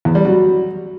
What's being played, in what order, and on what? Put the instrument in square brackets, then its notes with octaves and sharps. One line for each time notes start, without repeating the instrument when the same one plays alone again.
[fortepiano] E2
G3
F#3